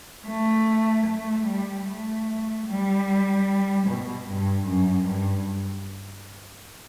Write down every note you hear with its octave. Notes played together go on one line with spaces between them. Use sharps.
A3
A3
G3
A3
G3
B2
G2
F#2
G2